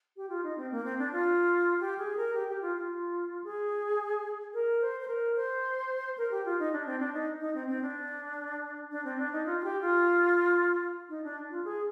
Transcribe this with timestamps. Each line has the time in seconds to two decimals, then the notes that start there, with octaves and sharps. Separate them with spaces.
0.17 G4
0.29 F4
0.44 D#4
0.57 C4
0.71 A#3
0.85 C4
0.99 D4
1.12 F4
1.80 G4
1.98 G#4
2.17 A#4
2.34 G4
2.48 G4
2.62 F4
2.76 F4
3.44 G#4
4.54 A#4
4.82 C5
5.01 C5
5.08 A#4
5.36 C5
6.18 A#4
6.31 G4
6.45 F4
6.59 D#4
6.73 D4
6.86 C4
7.00 D4
7.14 D#4
7.41 D#4
7.55 C4
7.68 C4
7.82 D4
8.91 D4
9.05 C4
9.18 D4
9.33 D#4
9.46 F4
9.60 F4
9.64 G4
9.82 F4
11.09 D#4
11.24 D4
11.51 F4
11.65 G#4